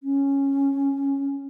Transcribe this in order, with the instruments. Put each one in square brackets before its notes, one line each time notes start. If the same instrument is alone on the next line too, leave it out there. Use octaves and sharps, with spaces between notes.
[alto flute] C#4